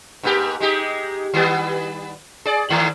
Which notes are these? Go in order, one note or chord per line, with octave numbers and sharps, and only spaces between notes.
G#2 A#3 G4
G#3 D#4 G4
D#3 G3 B3
G#4 D5
G#2 D#3 A3